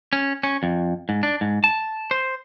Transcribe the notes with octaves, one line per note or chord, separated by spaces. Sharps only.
C#4
C#4
F2
G#2
D4
G#2
A5
C5